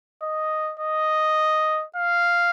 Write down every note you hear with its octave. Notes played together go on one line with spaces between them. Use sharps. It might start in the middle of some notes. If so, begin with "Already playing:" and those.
D#5
D#5
F5